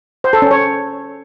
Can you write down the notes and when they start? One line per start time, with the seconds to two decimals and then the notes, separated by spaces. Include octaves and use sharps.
0.24 C5
0.33 A4
0.42 C#4
0.51 C#5